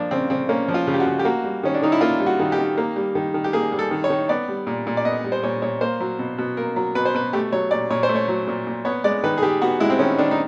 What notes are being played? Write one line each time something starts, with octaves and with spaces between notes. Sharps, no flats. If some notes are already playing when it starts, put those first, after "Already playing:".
Already playing: F3 A#3 D4
C#3 C4
C#3 C4
A#3 C#4
F3
F4
C#3
G4
F#4
C#3
G4
A#3 F#4
G3
D#3 C#4
D4
D#3 D#4
E4
A#3 F4
G3
F#4
D#3
G4
D#3
A#3
G3
D#3
D#3
G4
A#3 G#4
G3
A4
D#3
C#5
D#3
B3 D5
G3
A#2
A#2
D5
B3 D#5
G3
C5
A#2 C#5
A#2 C#5
A#3 C5
F#3
B2
B2
A#3 A#4
F#3
B2 B4
C5
B2 B4
A3 G4
F#3 C#5
A#2 D5
A#2 C#5
C5
A3
C#5
F#3
A#2
A#2
B3 C#5
G#3 D5
D#3 B4
G#4
D#3 G4
B3 F#4
G#3 E4
C4
D#3 C#4
D#3 D4
D#4